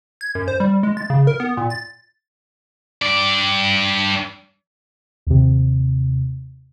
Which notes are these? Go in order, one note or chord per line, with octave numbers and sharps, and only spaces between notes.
G#6
F#2
C5
G3
G#3
A6
C#3
A#4
B3
A#2
A6
G2 D5
D#2 C3